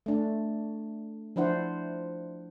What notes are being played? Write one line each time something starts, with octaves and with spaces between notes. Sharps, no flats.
A3 D4
F3 D4 E4 C5 F#5